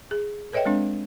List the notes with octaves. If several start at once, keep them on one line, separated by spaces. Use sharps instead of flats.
G#4
A4 B4 C#5 D#5 E5 G5
G#3 C4 D4